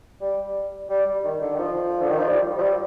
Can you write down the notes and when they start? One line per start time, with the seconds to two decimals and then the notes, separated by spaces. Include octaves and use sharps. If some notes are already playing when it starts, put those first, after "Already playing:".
0.21 G3
0.89 G3
1.06 G3
1.24 D#3
1.42 D3
1.54 D#3
1.58 F3
2.01 D3
2.10 D#3
2.19 F3
2.28 G3
2.58 F3
2.62 G3